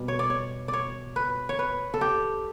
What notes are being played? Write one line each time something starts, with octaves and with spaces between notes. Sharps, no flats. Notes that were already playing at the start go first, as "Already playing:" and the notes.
Already playing: B2 G3
C#5
D5
C#5
D5
C#5
B4
C#5
B4
A4
G4